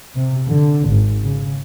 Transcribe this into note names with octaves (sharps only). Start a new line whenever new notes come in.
C3
D3
G#1
C#3